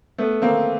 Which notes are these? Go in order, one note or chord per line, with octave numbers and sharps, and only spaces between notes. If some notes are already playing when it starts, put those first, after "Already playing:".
A3 B3
A#3 C4